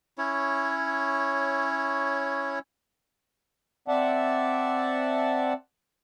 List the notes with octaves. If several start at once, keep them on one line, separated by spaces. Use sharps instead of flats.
C#4 E4 C#5
C4 D5 E5 F#5 A5